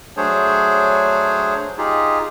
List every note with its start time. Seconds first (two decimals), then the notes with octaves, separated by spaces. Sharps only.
0.17 F#3 A3 D4 G#4 C5 C#5
1.78 D#4 F4 G4 G#4